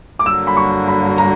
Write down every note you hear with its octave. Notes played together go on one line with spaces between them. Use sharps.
D6
G2 D3 F#3 A#3 E6
B5
C#6
B5
A#5